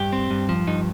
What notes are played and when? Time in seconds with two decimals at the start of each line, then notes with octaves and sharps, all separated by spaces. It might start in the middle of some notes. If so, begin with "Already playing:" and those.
Already playing: G2 G4
0.13 C4
0.30 G2
0.49 F3
0.67 G2 D#4